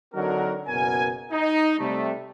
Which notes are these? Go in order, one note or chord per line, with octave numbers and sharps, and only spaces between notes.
D3 F#3 C4 D#4 F#4 A#4
F#1 B2 F#3 A#4 G#5
D#4
C3 G3 A3